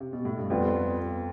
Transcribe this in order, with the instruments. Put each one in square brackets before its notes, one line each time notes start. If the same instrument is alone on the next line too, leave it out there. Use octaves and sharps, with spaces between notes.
[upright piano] C3
B2
A2
G2
[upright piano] F2 [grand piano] G3 B3 F4